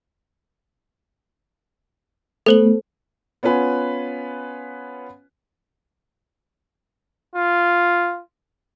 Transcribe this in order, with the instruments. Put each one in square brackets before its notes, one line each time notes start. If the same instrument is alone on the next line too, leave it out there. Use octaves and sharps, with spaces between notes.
[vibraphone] A3 B3 [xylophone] A4 C5 F#7
[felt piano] B3 C#4 F4 B4 G#5
[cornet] F4